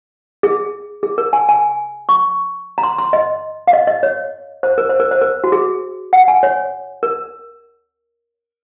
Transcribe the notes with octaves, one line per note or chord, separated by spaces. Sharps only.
G#4
G#4
A#4
G#5
G#5
C#6
A#5
C6
C6
D#5
F5
D#5
D#5
C#5
C5
A#4
C5
A#4
C5
A#4
F#4
G#4
F#5
G#5
C#5
A#4